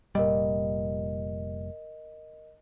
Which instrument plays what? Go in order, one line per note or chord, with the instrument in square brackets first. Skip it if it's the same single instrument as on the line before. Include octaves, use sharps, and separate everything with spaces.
[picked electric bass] F1 A#2 G3 [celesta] A#4 D#5